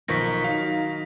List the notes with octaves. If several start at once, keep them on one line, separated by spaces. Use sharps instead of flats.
B1 D#3 F3 C#6 A#6 B6
F#3 D#4 F5